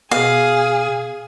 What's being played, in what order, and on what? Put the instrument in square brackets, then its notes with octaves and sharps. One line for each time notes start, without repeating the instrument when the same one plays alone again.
[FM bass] B2 [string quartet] G#4 [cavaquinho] F5